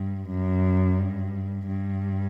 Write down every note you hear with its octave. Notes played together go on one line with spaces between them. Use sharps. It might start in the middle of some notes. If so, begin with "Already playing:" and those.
Already playing: G2
F#2
G2
G2